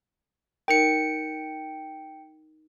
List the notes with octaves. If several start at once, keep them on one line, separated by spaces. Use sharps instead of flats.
D#4 A#4 G5 C#7